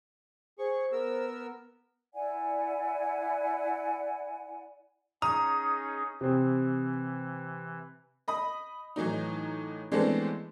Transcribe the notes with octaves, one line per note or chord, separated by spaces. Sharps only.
G#4 C5 C#6
B3 A#4 E6
E4 D5 F#5 G#5
C#4 D#4 G#4 A#5 D#6
C3 E3 C4
D#5 B5 D#6
A2 E3 F#3 D#4
E3 G#3 A3 B3 C4 D4